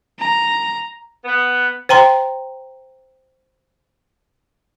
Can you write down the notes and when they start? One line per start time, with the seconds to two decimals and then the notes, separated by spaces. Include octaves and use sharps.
0.19 A#5
1.24 B3
1.89 C5 G5 A#5 C6